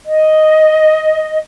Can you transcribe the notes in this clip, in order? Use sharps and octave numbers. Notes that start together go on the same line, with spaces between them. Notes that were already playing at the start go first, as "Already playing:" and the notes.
D#5